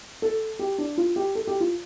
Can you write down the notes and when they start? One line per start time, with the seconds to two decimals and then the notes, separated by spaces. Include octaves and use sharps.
0.22 A4
0.59 G4
0.78 D4
0.98 F4
1.16 G4
1.35 A4
1.47 G4
1.60 F4